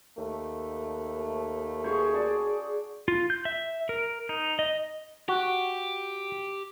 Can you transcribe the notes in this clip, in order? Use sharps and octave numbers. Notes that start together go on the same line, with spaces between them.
D#2 A3
F#4 G#4 C5 C#5
F#4 D5 A5
F4
G6
E5
A#4
D#4
D#5
F#4 G4